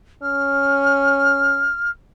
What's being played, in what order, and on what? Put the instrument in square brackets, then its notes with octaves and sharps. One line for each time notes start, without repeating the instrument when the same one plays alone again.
[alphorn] C#4 [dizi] F6